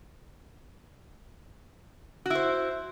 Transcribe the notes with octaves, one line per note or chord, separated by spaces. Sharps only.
E4 F#4 C5